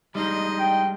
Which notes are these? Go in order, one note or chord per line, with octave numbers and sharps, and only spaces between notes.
G3 G#3 D4 D#4 D#5 C6
G5